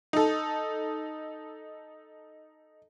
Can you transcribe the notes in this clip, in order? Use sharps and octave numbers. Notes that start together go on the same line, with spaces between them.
D#4 A4